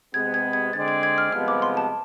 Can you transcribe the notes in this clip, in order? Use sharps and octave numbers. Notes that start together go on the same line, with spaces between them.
C3 G#3 B3 G#6
G#6
G#6
D3 G#3 C4 G#4 D5 A6
G#6
G#6
F6
C2 C3 F3 G#3 B3 F6
D6
C6
A5